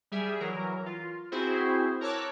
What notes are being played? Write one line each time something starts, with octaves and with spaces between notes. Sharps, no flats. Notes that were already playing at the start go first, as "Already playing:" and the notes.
G3 G#4 E5
E3 F#3 A#4
F4
C4 E4 F#4 G#4 C5
A#4 C#5 A5 D6 E6 F#6